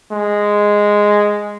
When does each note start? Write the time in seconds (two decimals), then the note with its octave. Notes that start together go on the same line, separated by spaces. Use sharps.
0.12 G#3